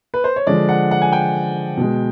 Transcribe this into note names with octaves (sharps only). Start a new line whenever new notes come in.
B4
C5
C#5
D3 F3 G#3 D5
F#5
F#5
G#5
G5
B2 G#3